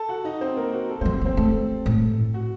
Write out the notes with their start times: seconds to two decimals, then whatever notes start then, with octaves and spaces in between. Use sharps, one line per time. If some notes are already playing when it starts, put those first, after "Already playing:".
Already playing: A4 A5
0.09 F#4 F#5
0.25 D#4 D#5
0.41 C4 C5
0.57 A#3 A#4
0.73 F#4
0.90 A4
1.01 A3 C4 C5
1.05 F#3
1.13 C4 C5
1.21 A#3
1.25 C4 C5
1.37 A3 A4
1.86 A2
2.34 F#4